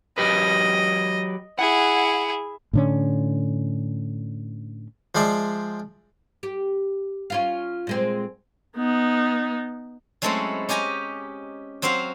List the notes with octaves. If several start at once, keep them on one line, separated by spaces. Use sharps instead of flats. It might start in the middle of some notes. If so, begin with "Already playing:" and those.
F#3 G4 B4 D#5
E4 G#4 F#5
A2 D3 C#4
F3 G#3 C5 D5 E5
G4
C#4 F4 F5
A#2 G#3 C4
B3 D#4
F#3 G#3 A3 C4 C#4 E4
C#4 G4 D#5 G#5 A#5
F#3 C4 F#4 C5 F5